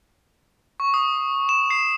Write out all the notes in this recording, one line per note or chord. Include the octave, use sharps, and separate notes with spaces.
C#6
D#6
E7
C7